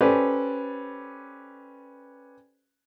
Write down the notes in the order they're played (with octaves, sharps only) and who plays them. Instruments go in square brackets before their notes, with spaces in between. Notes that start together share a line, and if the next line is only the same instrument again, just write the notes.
[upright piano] C#4 G4 A4 B4 C5 D5